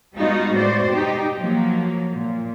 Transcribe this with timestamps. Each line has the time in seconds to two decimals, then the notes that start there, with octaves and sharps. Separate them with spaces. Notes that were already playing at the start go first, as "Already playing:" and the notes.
0.14 G3 G#3 B3 D#4 F4 F#4
0.53 A2 B3 F#4 C5 D5
0.90 B2 G3 D#4 G4
1.37 F3 F#3 A#3
2.14 A#2